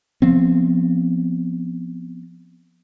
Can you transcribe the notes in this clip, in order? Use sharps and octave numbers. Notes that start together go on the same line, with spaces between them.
F3 B3 C4